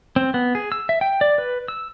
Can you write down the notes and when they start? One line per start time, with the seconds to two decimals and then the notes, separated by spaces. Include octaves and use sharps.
0.16 C4
0.34 B3
0.55 G#4
0.72 E6
0.89 E5
1.01 G5
1.21 D5
1.38 B4
1.68 E6